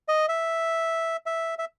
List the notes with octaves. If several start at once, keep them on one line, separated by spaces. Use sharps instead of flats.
D#5
E5
E5
E5